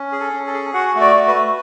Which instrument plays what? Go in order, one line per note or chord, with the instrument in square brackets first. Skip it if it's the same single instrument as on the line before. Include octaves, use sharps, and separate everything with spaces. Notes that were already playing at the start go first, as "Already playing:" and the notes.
Already playing: [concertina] C#4
G#4
A4
C#4
A4
G#4
F#4 F#5
A3
D5
F#4
B4
A3